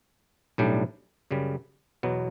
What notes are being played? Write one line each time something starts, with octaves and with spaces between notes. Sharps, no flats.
B1 A2 G3 D4
F#2 C#3 G3
E2 B2 F#3 B3